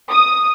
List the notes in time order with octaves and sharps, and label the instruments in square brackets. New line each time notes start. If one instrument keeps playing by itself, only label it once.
[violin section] D#6